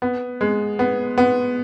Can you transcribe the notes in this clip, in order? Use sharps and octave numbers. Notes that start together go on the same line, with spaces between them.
B3
G#3
B3
B3